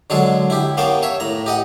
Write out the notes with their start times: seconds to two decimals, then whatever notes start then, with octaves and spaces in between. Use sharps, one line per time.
0.10 D3 F#3 G#3 G#4 A4
0.50 E4 G4
0.77 A#3 B3 C#4 F5 G5 A5
1.03 C#5 E5
1.20 A2 A#5
1.46 G4 D#5 F#5